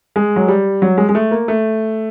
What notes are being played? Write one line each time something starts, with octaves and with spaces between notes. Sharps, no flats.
G#3
F#3
G3
F#3
G#3
G#3
A3
A#3
A3